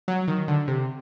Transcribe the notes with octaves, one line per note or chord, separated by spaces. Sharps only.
F#3
D#3
D3
C3